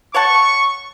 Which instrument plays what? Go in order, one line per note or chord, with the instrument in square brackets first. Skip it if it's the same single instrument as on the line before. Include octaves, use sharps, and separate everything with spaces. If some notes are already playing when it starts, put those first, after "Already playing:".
[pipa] C#5 F#5 A5 [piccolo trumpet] C#6